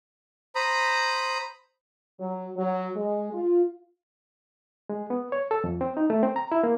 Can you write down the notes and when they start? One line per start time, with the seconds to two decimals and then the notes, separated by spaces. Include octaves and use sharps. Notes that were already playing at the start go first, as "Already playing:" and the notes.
0.55 C5 A#5 B5 D#6
2.20 F#3
2.57 F#3
2.96 G#3
3.33 F4
4.89 G#3
5.10 B3
5.32 C#5
5.51 A4
5.64 F2
5.81 C4
5.97 D#4
6.10 A3
6.23 C4
6.36 A#5
6.52 E4
6.63 A#3